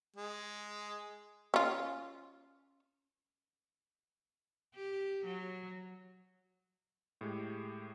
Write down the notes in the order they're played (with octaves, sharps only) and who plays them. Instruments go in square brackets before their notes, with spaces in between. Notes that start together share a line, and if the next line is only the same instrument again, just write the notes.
[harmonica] G#3
[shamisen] C#4 F4
[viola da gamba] G4
F#3
[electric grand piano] A2 G#3 G4